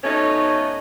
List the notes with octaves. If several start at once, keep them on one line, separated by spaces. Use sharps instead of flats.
B2 A3 C#4 D#4